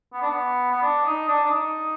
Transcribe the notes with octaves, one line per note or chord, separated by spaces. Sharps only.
B3
D4
B3
B3
D4
D#4
D4
D4
D#4